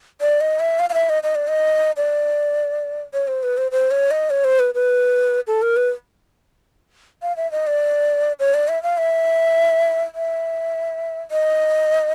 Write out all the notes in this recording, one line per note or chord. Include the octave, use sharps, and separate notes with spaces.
D5
D#5
E5
F5
F5
E5
D#5
D#5
D5
D#5
D5
C#5
C5
B4
C5
C5
C#5
D#5
C#5
C5
B4
B4
A4
A#4
B4
F5
E5
D#5
D5
C#5
D5
E5
F5
E5
E5
D#5